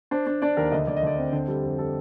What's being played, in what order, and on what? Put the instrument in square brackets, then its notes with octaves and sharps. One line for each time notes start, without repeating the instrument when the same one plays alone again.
[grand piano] D4 C5
D4
D4 D5
D#2 A#4
D2 D#5
D2 D5
D#5
D2 D5
C4
D3 C5
G3 A4
F2 G4
G3 A4